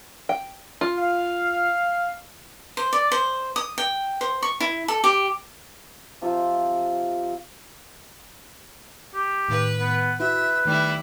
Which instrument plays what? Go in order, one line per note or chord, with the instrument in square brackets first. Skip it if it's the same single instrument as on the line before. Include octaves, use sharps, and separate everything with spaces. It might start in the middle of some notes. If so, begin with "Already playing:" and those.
[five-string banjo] G5
F4
[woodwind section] F5
[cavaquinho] C5
D5
C5
D#6
G5
C5
C#6
E4
A4
G4
[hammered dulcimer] C3 F3 F4 E5
[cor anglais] G4
[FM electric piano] A2 D#3 [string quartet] B4
[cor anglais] B3
[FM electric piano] E4 F#4 [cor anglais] B4 [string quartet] E5
[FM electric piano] D#3 A3 [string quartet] G3 E4